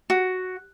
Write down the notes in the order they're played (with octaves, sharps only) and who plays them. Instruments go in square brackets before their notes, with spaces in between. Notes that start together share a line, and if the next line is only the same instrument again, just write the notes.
[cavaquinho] F#4